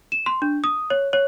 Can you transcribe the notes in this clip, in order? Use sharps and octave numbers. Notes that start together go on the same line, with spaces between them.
E7
C6
D4
D#6
C#5
C#5